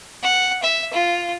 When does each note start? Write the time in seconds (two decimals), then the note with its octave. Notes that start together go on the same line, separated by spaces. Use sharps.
0.22 F#5
0.63 E5
0.93 F4